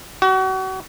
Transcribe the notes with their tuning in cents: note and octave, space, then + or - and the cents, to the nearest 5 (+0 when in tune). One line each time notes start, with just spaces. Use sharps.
F#4 +35